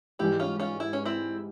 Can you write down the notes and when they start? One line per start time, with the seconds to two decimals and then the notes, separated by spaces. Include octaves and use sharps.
0.19 G#2 E3 G3 E4 G4
0.40 C#4 F4
0.60 C#4 F4
0.80 E4
0.93 C#4
1.05 C4 E4